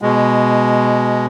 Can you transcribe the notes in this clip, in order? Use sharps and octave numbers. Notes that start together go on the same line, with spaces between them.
B2 G#3